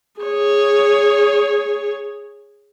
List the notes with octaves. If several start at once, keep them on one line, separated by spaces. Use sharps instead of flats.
G#4 C#5